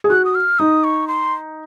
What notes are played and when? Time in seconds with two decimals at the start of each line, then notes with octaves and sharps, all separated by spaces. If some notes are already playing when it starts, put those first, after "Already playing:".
0.04 G#4
0.10 F#4 F#6
0.25 D#6
0.35 F6
0.59 D#4 D#6
0.84 C#6
1.08 C6